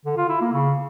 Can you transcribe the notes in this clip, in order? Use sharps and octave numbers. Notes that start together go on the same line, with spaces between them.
D3
F4
E4
A#3
C#3